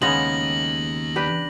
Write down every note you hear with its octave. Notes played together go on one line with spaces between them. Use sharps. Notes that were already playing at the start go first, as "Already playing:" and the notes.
D#2 C#3 G#3 B3 D#4 C#5 A#6 F#7
D4 G4 B4